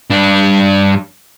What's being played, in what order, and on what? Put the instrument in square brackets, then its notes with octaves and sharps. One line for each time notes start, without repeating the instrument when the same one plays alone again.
[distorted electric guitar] G2 D4